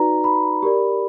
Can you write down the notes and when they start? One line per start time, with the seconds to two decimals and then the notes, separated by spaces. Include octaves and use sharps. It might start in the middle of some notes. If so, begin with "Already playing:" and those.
Already playing: D#4 F#4 B4 D5 A#5
0.24 B5
0.63 G4 A#4 D5